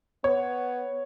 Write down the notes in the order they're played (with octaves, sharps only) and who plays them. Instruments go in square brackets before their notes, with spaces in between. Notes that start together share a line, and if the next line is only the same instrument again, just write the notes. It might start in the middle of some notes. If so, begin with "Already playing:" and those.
[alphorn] B3 [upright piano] C#5